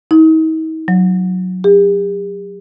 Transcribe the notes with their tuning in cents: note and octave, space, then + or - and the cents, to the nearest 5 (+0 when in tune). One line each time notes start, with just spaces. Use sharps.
D#4 +45
F#3 -10
G4 +45